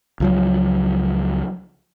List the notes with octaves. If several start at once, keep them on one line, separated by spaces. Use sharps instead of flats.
C#2 F3 F#3